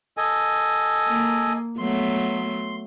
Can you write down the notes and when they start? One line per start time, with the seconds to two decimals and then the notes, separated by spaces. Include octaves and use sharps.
0.17 A4 D#5 G#5
1.07 A#3
1.78 F#3 A3 B3 C6